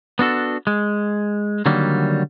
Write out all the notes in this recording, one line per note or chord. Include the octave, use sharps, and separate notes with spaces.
B3 D4 F#4 A4
G#3
D3 D#3 F#3 G3 A#3